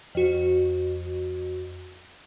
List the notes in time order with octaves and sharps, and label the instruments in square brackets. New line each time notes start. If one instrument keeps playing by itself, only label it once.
[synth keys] F2 F#4